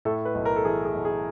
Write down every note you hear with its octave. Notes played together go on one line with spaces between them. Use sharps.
A2 A4
B4
B1
A#4
A4
E3 G#4
G#4
B1
G#4